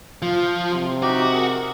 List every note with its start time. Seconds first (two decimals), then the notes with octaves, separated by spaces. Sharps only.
0.22 F3 F4
0.71 C3
1.03 D#4 F#4 G4 D6
1.32 G#4 A#4